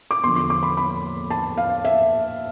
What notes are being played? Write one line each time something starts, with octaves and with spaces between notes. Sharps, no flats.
D6
E2 D3 F3 C6
C6
D6
B5
B5
A5
F5
E5